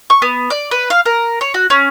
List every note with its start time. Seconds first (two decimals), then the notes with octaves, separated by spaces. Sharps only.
0.10 C#6
0.22 B3
0.50 D5
0.71 B4
0.90 F5
1.06 A#4
1.41 C#5
1.54 F#4
1.70 C#4